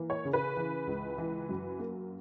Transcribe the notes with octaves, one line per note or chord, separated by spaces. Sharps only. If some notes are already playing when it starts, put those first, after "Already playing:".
Already playing: E3 A#3
C#5
C#3
B4
E3
C#2
E3
F#2
A#3